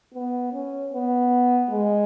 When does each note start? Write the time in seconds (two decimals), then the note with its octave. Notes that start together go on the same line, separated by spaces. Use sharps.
0.14 B3
0.53 C#4
0.93 B3
1.70 G#3